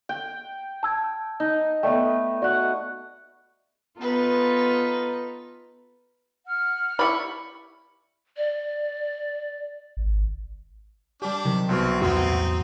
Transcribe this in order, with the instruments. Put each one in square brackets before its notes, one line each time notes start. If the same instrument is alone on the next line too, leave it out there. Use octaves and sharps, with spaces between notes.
[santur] G5
[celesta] A5 E6 G#6
[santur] D#4
[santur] A3 B3 [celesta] D5 G5
[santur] F#4 F#5 [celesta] D5
[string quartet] B3 D#4 F4 A4 B4
[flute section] F#5 F6
[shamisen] E4 G4 D5 [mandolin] B5 C#6
[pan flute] D5
[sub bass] G#1
[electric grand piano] G3 G4 [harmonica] D4
[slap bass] C3 [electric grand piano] D#3 [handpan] F#3
[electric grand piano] C2 B2 C#6 [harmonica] C4
[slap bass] E2 A2 [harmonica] C4 D#4 [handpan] F#4